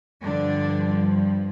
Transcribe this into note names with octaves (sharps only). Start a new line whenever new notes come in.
G2 D3 F3 D4